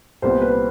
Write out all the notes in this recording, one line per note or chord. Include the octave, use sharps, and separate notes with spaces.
C2 A#2 G3 B3 C5
B4